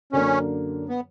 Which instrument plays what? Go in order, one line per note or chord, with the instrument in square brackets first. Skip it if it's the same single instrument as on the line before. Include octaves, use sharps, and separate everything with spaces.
[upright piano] F#2 D3 F#3 A#3 D4 [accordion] C#4
[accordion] B3